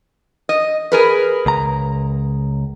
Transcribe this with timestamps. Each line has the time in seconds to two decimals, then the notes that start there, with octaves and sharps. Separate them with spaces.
0.49 D#5
0.92 G#4 A#4 B4
1.46 C#2 A#5